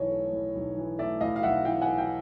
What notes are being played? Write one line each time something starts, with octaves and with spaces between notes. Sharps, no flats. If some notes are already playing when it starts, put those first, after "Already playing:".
Already playing: B1 E3 C#5 D#5
A3
A2
B1
E3
A3 D5 E5
A2 D#5 F5
F5
B1 E5 F#5
E3 F5 G5
F#5 G#5
A3
F5 G5